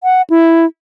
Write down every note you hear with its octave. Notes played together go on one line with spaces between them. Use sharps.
F#5
E4